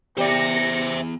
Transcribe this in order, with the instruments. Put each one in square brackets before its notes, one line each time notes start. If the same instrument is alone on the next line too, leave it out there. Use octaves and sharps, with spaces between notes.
[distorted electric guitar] E2 [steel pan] G4 D5 [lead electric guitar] C5 E5 [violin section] A#6 C#7